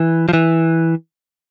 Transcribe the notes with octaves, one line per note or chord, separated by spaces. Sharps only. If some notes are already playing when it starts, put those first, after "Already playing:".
Already playing: E3
F3
E3